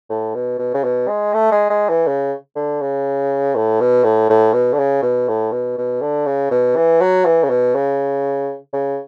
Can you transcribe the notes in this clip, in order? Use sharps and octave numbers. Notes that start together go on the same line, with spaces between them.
A2
B2
B2
C#3
B2
G#3
A3
G#3
G#3
E3
C#3
D3
C#3
A2
B2
A2
A2
B2
D3
C#3
B2
A2
B2
B2
D3
C#3
B2
E3
F#3
E3
C#3
B2
C#3
C#3